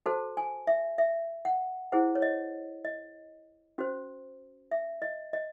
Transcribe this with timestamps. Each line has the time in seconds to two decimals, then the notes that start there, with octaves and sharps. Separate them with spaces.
0.06 F#4 A4 C5 A5
0.37 G#5
0.67 E5
0.98 E5
1.45 F#5
1.92 E4 G#4 C5 F#5
2.15 C#5
2.22 D#5
2.85 D#5
3.78 C#4 F#4 C5
4.71 E5
5.02 D#5
5.33 D#5